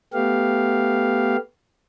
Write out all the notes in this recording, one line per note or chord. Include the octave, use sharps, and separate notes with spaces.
A3 B3 G4 F5